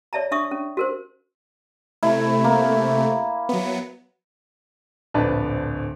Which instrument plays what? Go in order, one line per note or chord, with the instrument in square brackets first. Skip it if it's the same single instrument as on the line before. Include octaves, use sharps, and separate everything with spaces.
[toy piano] C#5 D5 E5 A5 A#5
D4 E5 C#6 D#6
C#4
F#4 A#4 C5
[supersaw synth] C3 A3 [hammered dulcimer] E4
[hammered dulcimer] A#3
[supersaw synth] F#3 B3
[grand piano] D1 A#1 D3 D4 B4 A5